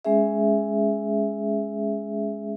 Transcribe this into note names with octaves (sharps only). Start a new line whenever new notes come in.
G#3 C#4 G#4 E5